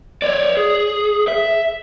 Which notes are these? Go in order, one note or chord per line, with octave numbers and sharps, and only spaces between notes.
C#5 D5
G#4
E5